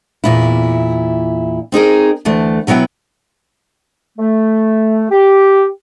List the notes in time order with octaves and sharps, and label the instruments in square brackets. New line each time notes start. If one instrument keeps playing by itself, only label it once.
[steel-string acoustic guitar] E2 A#2 E4
C4 D#4 G#4 A#4
D2 E3 A3
B2 F#3 B3 E4 G5
[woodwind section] A3
G4